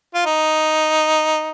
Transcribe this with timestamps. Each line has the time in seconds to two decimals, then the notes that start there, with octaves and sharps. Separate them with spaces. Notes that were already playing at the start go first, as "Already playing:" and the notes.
0.14 F4
0.26 D#4